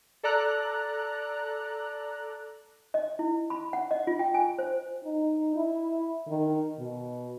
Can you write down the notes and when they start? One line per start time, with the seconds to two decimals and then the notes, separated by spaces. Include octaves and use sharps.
0.23 A4 D5 A#5 F#6
2.94 D#5
3.19 E4
3.50 B5
3.73 F#5
3.91 D#5
4.07 F4
4.19 G5
4.34 G#5
4.58 C5
5.04 D#4
5.56 E4
6.28 D#3
6.79 B2